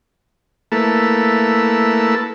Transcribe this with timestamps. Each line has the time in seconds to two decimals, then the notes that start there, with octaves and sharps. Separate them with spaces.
0.72 A3 A#3 E4 A4 B4